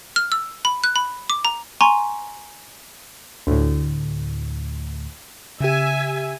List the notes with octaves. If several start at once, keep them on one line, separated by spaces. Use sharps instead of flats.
F6
E6
B5
F#6
B5
D6
A#5
G#5 A#5 C6 C#6
D2 A2
C#3 G4 E5 G#5